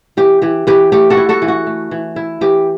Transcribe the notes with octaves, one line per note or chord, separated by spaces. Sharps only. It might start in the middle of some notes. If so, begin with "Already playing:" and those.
E3 G4
E3 G4
E3 G4 B4
A3 G4
F#4 A4
E4
F#4 A4
E3
F#4
A3
E3
E4
E3 G4